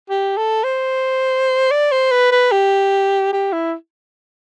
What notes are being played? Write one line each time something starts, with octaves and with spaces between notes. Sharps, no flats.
G4
A4
C5
D5
C5
B4
B4
G4
G4
E4